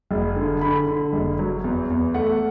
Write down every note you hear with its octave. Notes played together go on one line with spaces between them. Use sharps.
F#1
D3
D3 B5
D3
F#1
F#3
E2
E2
A3 F#5